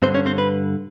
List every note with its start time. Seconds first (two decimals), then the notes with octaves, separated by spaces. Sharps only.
0.02 G2 D3 C4 C5
0.14 C#4 C#5
0.26 C4 C5
0.38 B4